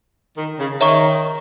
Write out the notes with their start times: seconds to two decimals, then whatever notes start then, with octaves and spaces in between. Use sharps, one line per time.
0.37 D#3
0.59 C#3
0.81 D#3 C#5 E5 A#5 C#6